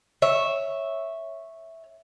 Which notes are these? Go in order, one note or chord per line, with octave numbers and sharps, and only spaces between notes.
C#5 E5